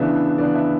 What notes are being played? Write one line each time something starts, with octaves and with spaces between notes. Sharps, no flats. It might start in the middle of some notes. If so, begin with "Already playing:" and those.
Already playing: C#3 E3 B3 D4 E5
C#3 E3 B3 D4 D5
E5